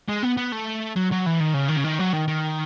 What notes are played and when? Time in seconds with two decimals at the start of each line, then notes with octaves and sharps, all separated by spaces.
0.08 G#3
0.23 B3
0.37 B3
0.52 A3
0.96 F#3
1.11 F#3
1.26 E3
1.40 D#3
1.54 C#3
1.69 D#3
1.78 C#3
1.84 D#3
1.99 F#3
2.13 D#3
2.28 D#3